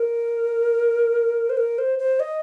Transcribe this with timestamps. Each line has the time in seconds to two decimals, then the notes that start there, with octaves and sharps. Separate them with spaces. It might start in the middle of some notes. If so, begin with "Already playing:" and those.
Already playing: A#4
1.50 C5
1.57 A#4
1.78 C5
1.99 C5
2.20 D#5